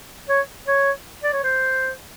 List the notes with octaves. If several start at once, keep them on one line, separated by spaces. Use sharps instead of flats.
C#5
C#5
D5
C#5
C5